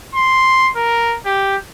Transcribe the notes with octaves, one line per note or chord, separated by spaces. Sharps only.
C6
A#4
G4